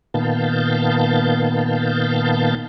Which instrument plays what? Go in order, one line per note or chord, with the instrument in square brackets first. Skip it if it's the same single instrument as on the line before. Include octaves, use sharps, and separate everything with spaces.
[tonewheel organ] A#2 D#3 B3 F5 A5 G6